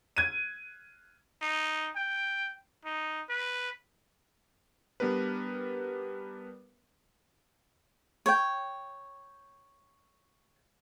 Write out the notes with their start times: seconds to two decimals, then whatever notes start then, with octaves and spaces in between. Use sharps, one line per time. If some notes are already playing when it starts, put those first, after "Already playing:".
0.17 G#6 D#7
1.41 D#4
1.95 G5
2.85 D#4
3.29 B4
5.00 G3 B3 D4 A#4 B4
8.26 C#5 G5